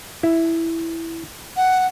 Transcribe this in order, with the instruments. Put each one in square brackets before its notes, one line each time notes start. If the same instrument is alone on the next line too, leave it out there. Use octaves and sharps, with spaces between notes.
[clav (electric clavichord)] E4
[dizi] F#5